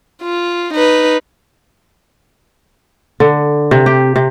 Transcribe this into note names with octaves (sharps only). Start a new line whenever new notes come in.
F4
D#4 B4
D3
C3
G4
C3